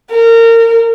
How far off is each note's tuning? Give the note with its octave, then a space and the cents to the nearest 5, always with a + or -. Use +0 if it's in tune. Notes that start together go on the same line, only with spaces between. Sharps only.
A#4 -25